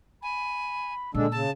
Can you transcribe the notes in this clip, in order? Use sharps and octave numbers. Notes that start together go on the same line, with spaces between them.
G#5 B5
A#2 D3 G#3 D4 E6
C#3 A5